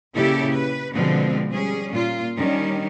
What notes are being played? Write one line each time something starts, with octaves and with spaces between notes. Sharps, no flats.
A#2 C#3 E4 G4 A4
B4
B2 D3 F3 G#3 B3 C4
G3 C#4 G#4
A#2 F4
D#3 G3 C#4 D4